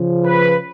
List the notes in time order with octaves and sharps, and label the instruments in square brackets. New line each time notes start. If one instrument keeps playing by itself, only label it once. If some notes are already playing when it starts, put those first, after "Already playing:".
Already playing: [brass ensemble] C#3 F3
B4